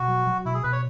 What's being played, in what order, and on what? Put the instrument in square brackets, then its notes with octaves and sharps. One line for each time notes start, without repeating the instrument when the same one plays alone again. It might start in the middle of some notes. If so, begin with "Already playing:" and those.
Already playing: [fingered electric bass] B2 [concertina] F#4
[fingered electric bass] F#3
F#3
[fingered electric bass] B2 [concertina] E4
[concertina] G#4
[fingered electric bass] B2 [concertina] B4
[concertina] C#5